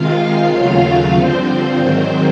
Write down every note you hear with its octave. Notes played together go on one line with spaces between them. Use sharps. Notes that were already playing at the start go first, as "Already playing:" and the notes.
Already playing: C3 D#3 G#3 F4 F5
D#2 C#3 F#3 A3
G2 D3 F3 C4 C5
G#2 D#3 F#3